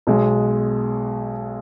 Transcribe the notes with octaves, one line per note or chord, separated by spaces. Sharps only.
B1 B2 G#3